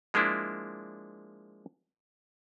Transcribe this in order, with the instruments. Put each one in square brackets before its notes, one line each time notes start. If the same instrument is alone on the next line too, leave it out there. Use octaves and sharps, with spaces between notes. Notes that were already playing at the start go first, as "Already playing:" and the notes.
[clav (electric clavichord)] F3 G#3 A#3 D4 E4